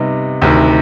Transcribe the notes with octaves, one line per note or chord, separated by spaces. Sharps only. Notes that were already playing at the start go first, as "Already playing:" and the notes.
Already playing: C3 G3 B3 D#4
D2 C3 D#3